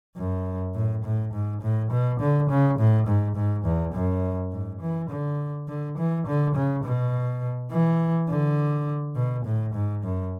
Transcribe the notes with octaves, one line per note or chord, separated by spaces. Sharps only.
F#2
A2
A2
G#2
A2
B2
D3
C#3
A2
G#2
G#2
E2
F#2
G#2
E3
D3
D3
E3
D3
C#3
B2
E3
D3
B2
A2
G#2
F#2